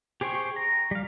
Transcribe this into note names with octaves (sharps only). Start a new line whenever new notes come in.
G4 G#4 C5 G5 C#6
A#5
G3 F5